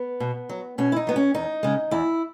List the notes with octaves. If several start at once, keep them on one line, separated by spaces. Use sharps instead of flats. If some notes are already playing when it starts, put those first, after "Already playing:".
Already playing: B3
B2
F#3
B2 C#4
E4
D#4
F#3 B3
C#4
E2 D#4
C#3 G#3
E2 E4